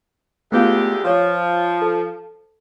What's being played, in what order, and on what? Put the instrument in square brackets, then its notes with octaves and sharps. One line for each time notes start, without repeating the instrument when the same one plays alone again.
[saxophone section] D2 G#3 G4 [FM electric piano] A3 B3 F4
[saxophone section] F3 [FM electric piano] F4 C#5
[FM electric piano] A4